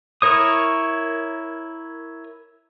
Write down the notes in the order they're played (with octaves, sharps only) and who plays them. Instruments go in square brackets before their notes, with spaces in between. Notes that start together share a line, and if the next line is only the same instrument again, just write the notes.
[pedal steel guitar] E4 A#4 C#5 D#6